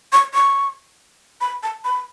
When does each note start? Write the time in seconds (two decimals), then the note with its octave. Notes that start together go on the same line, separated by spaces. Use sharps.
0.13 C#6
0.34 C#6
1.41 B5
1.63 A5
1.84 B5